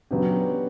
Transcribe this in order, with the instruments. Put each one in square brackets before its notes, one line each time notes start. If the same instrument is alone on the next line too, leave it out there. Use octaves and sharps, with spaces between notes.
[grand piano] C#3 F#3 B3 D4 G4